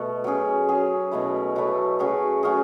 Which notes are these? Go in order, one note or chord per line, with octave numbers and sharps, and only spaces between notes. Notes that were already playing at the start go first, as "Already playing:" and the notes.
Already playing: B2 A3
F#3 C#4 G#4
F#3 C#4 G#4
B2 F#3 A3 E4
B2 F#3 A3 E4
F#3 A3 C#4 G#4
F#3 A3 C#4 G#4